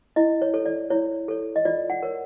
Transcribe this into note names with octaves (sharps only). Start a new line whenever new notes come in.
E4 D#5
C#5
A4 C#5
D5
E4 C#5
A4 C#5
D#5
F4 D5
F#5
A#4 C#5